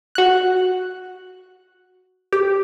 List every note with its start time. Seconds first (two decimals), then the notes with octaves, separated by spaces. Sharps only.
0.15 F#4 F#6
2.33 G4